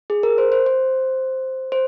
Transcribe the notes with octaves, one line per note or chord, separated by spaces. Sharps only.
G#4
A#4
C5
C5
C5
C5